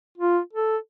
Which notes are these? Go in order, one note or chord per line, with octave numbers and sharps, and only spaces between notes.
F4
A4